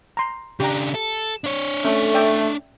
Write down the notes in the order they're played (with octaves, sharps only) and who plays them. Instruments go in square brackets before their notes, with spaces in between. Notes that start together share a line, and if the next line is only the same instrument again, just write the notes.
[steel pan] A#5 C6
[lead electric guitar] C#3 D4 [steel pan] G4 A#5
[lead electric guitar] A4
D4 C#5
[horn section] A3 [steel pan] C#4 A4
[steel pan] D5 E5 G5